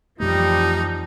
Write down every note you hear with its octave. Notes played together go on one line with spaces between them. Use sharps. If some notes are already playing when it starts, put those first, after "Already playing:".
F2 E3 F3 G3 A3 D#4 G4